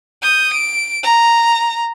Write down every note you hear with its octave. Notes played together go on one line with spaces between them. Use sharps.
D#6 G6
D7
A#5